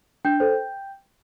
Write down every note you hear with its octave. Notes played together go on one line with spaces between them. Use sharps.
D4 G5 G6
A4 C5